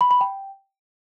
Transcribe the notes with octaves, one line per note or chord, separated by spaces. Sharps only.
B5
B5
G5